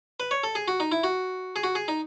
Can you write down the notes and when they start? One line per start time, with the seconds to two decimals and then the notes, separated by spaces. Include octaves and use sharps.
0.20 B4
0.31 C#5
0.44 A4
0.55 G#4
0.68 F#4
0.80 D#4
0.92 E4
1.04 F#4
1.56 G#4
1.64 F#4
1.75 G#4
1.88 D#4